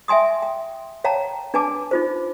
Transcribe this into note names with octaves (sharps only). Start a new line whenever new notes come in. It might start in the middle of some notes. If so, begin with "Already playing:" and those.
E5 G5 G#5 C6 D#6
G5
C#5 F5 G5 A5 A#5
D4 B4 G#5 A5 D6
D#4 F4 C5